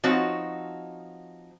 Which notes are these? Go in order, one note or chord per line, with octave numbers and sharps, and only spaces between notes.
F3 C4 D#4 F#4 C#5